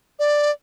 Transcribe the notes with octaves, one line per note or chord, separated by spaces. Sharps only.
D5